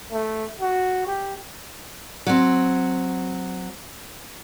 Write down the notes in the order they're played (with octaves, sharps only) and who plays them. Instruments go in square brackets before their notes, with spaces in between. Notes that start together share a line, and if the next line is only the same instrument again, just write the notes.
[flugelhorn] A3
F#4
G4
[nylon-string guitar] F#3 C4